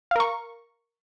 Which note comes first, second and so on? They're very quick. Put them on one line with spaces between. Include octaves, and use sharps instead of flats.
F5 A#4 C#6